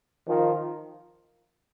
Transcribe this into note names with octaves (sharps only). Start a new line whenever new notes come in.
D#3 F3